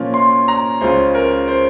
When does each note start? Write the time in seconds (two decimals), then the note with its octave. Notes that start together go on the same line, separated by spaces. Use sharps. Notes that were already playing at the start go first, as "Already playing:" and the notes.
Already playing: A#2 F3 A#3 C#4 F4
0.14 C6
0.48 A#5
0.81 C#2 C#3 G#3 C#4 F4 C5
1.15 A#4
1.48 C5